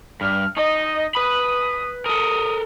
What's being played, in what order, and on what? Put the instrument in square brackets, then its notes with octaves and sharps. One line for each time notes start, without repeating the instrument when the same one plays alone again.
[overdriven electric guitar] G2 [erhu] F6
[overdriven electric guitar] D#4 [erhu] D#5
[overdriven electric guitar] B4 B5 [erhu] D#6
[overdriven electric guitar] A4 A#4 [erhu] D#6